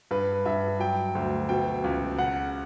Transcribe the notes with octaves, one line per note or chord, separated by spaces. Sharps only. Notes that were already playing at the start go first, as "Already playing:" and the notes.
G2 B4
G2 E5
F#3 G5
D2
B2 G5
C#2
C#3 F#5